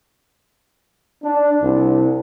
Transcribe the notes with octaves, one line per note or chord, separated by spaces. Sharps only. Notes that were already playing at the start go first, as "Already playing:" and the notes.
D4
C2